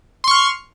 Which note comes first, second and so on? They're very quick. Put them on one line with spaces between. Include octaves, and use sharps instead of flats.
C6 C#6 F6